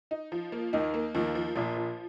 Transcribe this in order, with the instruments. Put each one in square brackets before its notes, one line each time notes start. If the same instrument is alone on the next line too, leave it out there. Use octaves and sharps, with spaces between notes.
[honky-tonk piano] D#4
F3
A#3
[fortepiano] D#2 D#3 [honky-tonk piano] D#4
[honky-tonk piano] A#3
[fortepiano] D#2 D#3 [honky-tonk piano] F3
[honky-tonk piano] F3
[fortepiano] A#1 A#2 [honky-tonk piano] F3
[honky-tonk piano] F3